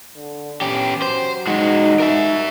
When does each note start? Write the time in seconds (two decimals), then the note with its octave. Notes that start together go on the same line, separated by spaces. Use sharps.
0.17 D3
0.61 B3 C#4 G4
1.02 F#3 C5
1.47 G#3 D#4 F#4
2.00 A#4 E5